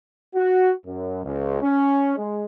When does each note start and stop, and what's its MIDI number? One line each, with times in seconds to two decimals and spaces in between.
0.35 0.71 66
0.85 1.20 42
1.24 1.61 37
1.61 2.13 61
2.17 2.44 56